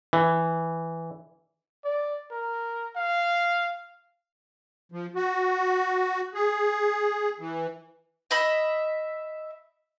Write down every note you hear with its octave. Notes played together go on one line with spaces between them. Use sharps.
E3
D5
A#4
F5
F3
F#4
G#4
E3
D#5 E5 B5